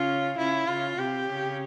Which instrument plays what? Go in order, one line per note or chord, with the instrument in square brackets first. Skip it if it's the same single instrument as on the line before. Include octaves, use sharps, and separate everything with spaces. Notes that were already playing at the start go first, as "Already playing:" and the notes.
Already playing: [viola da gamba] C#3 C#4 [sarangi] F4
[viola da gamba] C#3 C#4 [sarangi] E4
[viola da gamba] C#3 C#4 [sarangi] F4
[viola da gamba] C3 C4 [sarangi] G4
[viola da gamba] C#3 C#4